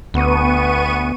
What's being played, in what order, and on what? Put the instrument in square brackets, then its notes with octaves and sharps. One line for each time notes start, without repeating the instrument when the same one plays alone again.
[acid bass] D2 [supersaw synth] B3 C#6 D#7